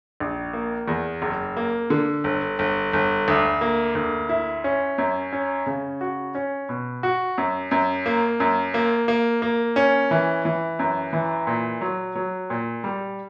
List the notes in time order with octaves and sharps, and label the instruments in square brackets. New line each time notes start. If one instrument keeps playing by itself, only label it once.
[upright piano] A#1
A#3
E2
F#1
A#3
D3
G1
G1
G1
D2
A#3
D2
E4
C#4
F#2
C#4
C#3
F#4
C#4
B2
F#4
F#2
F#2
A#3
F#2
A#3
A#3
A#3
C#4
E3
E3
F#2
E3
A#2
F#3
F#3
A#2
G3